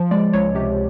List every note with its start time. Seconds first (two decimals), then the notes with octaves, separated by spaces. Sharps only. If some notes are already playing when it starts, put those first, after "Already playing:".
Already playing: F3
0.11 G#3 D5
0.33 C#2 C#5
0.55 C3 G4